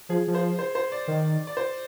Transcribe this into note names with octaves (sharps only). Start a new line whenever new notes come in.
F3 G#4
F3
C5
C5
C5
D5
D#3
D5
C5